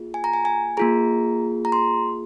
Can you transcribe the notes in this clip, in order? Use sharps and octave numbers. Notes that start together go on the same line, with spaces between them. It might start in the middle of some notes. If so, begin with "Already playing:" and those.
Already playing: A#3 F4 G#4
G#5
A#5
G#5
G#5
A#3 F4 G#4 A#5
A#5
C6